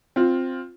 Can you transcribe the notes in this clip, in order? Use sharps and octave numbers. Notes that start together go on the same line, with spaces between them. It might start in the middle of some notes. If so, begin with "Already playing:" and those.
C4 F4